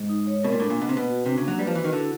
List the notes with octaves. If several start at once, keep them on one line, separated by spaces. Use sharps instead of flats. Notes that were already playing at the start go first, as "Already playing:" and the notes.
Already playing: G#2
D#4
C#5
B2 A#4
A#2
A2 D4
A#2
A#3
B2
C3
B2 B4
F#4
C3 D4
C#3 A#3
F#3
G3 B4
F3
E3 F#4
D#3
D3 E4